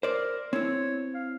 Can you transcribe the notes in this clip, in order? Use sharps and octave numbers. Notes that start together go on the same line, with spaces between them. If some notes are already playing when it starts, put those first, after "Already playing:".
A#4 C5 D5
C4 E4 C#5
F5